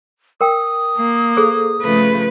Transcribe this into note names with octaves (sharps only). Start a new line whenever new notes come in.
A#4 G5 D#6
A#3
G#4 A4 C5
C#3 F3 A3 B4